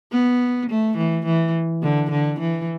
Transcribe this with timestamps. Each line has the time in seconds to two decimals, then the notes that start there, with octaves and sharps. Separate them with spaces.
0.12 B3
0.70 A3
0.97 E3
1.26 E3
1.83 D3
2.11 D3
2.40 E3